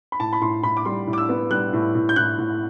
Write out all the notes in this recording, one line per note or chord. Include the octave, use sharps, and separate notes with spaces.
B5
A2 A5
B5
A2 C6
A2 B5
D6
G3 C6
A2
D6
E6
B3
G3 F#6
A2
A2
G6
A2 F#6
A2